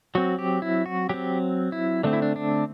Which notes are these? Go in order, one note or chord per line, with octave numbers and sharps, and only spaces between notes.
F#3 C4 F#4
G4
E4
F#4
F#3 C4 G4
E4
D3 A3 C4 D4
E4
D4
D4